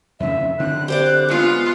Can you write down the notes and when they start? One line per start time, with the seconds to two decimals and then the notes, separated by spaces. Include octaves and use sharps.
0.20 F2 C#3 E5
0.60 D3 C4 F#6
0.88 G4 C5 D5
1.28 E3 G#3 B3 F4